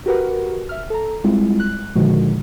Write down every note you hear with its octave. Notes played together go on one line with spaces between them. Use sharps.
F#4 G4 A#4 B4 F#5
E5 F6
A4 A#5
G3 G#3 C4 E4 F4
F#6
A#2 D3 D#3 F3 G#3 F#4